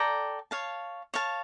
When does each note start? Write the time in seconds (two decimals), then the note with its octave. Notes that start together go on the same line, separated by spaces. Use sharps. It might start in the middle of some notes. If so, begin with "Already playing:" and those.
Already playing: A4 D5 G5 A#5
0.51 C#5 F5 A5
1.14 C#5 F5 A5